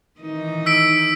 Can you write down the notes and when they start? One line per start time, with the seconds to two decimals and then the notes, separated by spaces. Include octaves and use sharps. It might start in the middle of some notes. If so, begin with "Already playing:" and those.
0.20 D#3 E3 D#4
0.66 E6 B6 D7